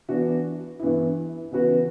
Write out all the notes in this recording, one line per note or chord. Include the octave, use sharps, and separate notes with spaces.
E3 B3 D4 F#4
G2 E3 B3 E4
C#3 E3 B3 F#4 B4